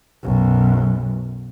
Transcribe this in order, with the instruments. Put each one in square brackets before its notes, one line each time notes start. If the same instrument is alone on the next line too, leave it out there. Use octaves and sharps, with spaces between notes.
[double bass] B1 F#2